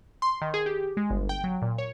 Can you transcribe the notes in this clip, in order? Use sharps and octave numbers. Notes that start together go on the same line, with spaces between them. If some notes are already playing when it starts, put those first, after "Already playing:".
C6
D#3
G#4
G4
G#3
G1
G5
F#3
A#2
C#5